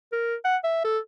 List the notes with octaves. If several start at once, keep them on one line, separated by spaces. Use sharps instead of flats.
A#4
F#5
E5
A4